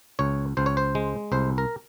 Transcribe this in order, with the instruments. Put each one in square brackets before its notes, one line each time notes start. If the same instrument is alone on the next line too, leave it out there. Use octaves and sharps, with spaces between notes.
[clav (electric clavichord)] C#2 C#5
C#2 C5
C#5
C5
G#3
C2 C5
A#4